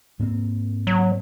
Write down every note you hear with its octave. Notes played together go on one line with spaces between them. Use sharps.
G#2 A#3 C4
F#3